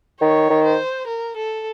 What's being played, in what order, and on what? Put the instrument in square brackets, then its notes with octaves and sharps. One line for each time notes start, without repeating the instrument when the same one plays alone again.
[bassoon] D#3 [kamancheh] C#5
[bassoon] D#3
[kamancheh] C5
A#4
A4